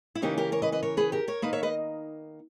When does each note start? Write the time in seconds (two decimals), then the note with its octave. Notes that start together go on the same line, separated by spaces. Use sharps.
0.15 E4
0.22 C#3 E3 A#3 C#4 D#4 G4
0.38 G4 A#4
0.52 A#4 C#5
0.62 B4 D#5
0.72 B4 D#5
0.83 A#4 C#5
0.97 G#4 B4
1.12 G4 A#4
1.28 A#4 C#5
1.42 D#3 A#3 D#4 B4 D#5
1.53 C#5 E5
1.63 B4 D#5